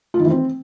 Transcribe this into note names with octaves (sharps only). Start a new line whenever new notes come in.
F4
D#3
E3
C4